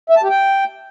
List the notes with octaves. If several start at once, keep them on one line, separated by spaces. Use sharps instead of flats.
E5
A5
G4
G5